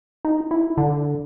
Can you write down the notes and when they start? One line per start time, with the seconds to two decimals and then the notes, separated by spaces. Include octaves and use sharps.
0.25 D#4
0.51 E4
0.77 D3